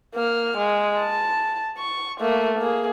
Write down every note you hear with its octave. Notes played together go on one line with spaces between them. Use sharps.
A#3 F6
G#3
A5
C#6
A3 A#3
A#3 G#4